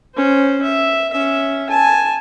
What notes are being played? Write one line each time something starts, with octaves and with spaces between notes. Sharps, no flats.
C#4 C5
E5
C#4 E5
G#5 A5